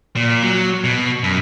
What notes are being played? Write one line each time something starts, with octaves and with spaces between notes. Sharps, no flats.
A#2
F#3
B2
F#2